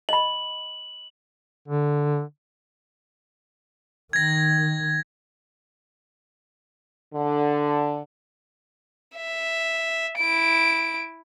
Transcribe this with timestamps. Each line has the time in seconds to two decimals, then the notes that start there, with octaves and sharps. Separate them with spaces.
0.09 D#5 B5 F#7
1.68 D3
4.13 D#3 G#6 A#6
7.14 D3
9.16 E5
10.18 E4 D7